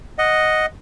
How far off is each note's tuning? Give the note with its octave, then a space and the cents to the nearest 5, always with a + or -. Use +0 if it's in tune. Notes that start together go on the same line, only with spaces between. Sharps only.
D#5 +0 F#5 -5